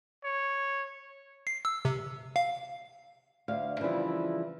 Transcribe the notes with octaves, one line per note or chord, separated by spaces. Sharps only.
C#5
C7
E6
C3
F5
D2 F5
C#3 E3 F3 G3 E4